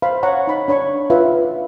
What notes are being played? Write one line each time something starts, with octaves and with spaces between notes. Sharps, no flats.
C5 F5 B5
C#5 F#5 A#5 C#6
D#4 B5
D4 C#5 B5 C#6
F4 B4 E5